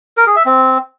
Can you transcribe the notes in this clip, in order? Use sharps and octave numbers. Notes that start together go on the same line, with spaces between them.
A#4
G#4
E5
C4